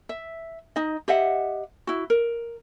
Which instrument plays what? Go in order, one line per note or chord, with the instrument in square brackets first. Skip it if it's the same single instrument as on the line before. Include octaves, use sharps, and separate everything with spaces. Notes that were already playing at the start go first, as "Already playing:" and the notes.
[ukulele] E5
D#4 D#5
G4 D#5 E5 F#5
E4 F#4
A#4